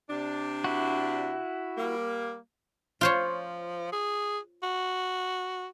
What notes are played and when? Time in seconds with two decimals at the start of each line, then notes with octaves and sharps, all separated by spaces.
0.09 C3 D4
0.64 E4 F#4
1.77 G3 A#3
3.01 F3 F4 C5 C#5
3.92 G#4
4.63 F#4